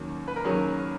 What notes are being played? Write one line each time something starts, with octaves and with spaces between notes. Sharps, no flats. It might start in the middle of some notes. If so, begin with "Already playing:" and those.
Already playing: D#2 D#3 F#3 C#4
B4
A#4
D#2 D#3 F#3 C#4 G#4